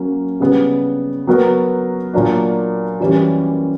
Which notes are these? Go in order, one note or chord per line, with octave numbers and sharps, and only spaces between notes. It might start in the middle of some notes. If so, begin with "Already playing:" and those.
Already playing: F#3 A#3 C#4
C#3 G3 B3
F#3 B3 F#4 A#4
A#2 F#3 A#3 D4
F#2 E3 G3 C#4